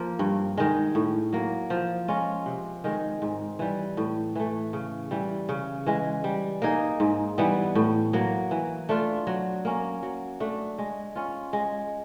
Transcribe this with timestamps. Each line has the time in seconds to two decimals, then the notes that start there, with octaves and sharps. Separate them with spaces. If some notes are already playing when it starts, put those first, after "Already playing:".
Already playing: F3 A#3
0.19 G2
0.57 D#3 G#3
0.95 A2
1.32 F#3 A#3
1.70 F3
2.08 G#3 C#4 F4
2.46 C3
2.84 D#3 G#3
3.22 G#2
3.59 E3 G3
3.97 A2
4.35 E3 A3
4.73 C#3
5.11 E3 G3
5.49 C#3
5.86 E3 G#3
6.24 G3
6.62 A#3 D#4 G#4
7.00 G#2
7.38 E3 G3 B3
7.75 A2
8.13 F#3 A#3
8.51 E3
8.89 A3 D4 F4
9.27 F#3
9.65 A#3 C#4
10.02 F#3
10.40 A3 D4
10.78 G#3
11.16 C#4 F4
11.53 G#3